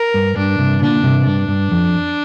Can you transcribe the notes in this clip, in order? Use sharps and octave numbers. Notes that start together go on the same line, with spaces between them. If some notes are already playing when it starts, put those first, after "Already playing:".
Already playing: A#4
G2
G2 D4
G2 C3
A#2 D3 D4
G2 C3
G2 D4
G2
F2